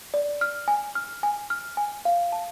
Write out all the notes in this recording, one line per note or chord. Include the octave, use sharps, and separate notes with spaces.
D5
F6
G#5
F6
G#5
F6
G#5
F5
A5